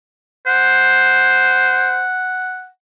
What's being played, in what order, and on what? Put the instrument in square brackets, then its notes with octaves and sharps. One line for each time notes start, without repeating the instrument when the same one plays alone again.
[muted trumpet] C5 [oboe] F#5